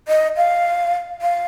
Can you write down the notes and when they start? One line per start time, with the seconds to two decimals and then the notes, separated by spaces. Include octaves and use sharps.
0.08 D#5
0.37 F5
1.22 F5